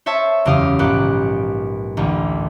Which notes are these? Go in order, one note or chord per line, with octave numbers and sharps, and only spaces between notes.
C5 C#5 E5 A5
F#1 E2 C#3 G4 F5 D#6
A#1 G#2 B3 G4 F#6
A1 D2